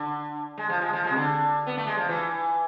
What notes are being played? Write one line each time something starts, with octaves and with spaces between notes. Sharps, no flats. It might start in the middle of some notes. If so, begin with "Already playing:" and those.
Already playing: D3
G#3
F3
G#3
F3
G#3
C3
D3
B3
A3
G#3
F3
E3